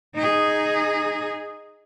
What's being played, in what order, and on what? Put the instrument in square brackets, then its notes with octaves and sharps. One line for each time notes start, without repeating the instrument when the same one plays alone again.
[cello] D#4 G#4